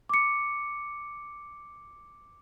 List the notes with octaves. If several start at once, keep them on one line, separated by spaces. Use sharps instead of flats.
D6 C#7